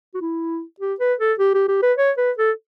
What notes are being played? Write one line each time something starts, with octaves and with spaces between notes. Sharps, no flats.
F#4
E4
G4
B4
A4
G4
G4
G4
B4
C#5
B4
A4